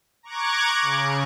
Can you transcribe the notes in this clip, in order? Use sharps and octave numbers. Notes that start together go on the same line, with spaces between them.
A#5 C#6 D6 F#6 G#6
C#3